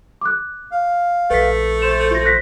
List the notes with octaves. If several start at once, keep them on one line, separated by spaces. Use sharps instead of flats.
D6 F#6
F5
A#1 A3 B4 B6
C5 E7
F4 A#6
F#6 A#6 B6